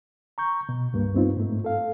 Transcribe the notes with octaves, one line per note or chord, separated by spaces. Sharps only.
A#5 C#6 G6
B2
C#2 G2 A#3
G2 B3 C4 D#4 F4
G#2 A3
A4 F5